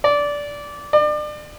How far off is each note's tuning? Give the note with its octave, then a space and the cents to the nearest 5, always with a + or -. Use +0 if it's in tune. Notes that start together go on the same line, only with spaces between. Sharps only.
D5 -15
D5 +35